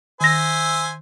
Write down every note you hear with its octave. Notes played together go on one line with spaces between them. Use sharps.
D#3 C5 E5 G#5 A#6